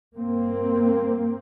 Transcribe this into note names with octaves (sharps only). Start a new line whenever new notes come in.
G2 A#3 C4